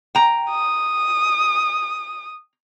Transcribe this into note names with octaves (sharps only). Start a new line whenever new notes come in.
G5 A#5
D#6